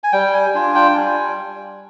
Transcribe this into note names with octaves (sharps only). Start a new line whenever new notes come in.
G#5
G3 G5
G#5
D4 F4 G#5
G5
G3 G#5